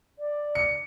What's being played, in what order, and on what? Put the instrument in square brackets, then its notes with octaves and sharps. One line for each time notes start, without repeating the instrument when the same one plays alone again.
[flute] D5
[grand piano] C#7